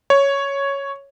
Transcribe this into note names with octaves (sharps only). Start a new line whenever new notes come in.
C#5